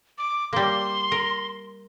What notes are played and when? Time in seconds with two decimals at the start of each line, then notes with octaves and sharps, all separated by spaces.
0.18 D6
0.53 G3 A#3 C6
1.12 A#4